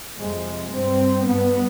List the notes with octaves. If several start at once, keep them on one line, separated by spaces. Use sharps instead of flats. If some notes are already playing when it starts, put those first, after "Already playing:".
F2 C3 G#3
G2 C4
G2 B3